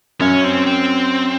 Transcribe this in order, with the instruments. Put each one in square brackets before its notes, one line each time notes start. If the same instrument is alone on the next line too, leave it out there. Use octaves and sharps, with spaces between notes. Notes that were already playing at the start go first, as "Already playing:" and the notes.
[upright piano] F#2 [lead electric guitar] C#4
[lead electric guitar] C4
C4